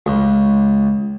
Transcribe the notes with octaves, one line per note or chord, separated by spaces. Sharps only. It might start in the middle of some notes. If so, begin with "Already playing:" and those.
C#2